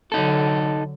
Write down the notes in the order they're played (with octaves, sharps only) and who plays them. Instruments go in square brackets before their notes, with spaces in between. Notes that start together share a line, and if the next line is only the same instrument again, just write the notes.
[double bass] D3 F#3 [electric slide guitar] D#4 A4